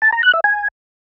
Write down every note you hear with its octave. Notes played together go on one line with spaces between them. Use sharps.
A5
A#5
F#6
E5
G#5